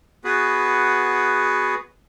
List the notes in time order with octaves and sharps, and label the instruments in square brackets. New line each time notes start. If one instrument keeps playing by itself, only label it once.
[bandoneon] B3 F#4 G#4 B4